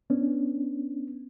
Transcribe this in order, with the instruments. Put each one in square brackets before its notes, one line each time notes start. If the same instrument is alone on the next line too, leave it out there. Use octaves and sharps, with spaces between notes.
[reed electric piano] B3 C#4 D4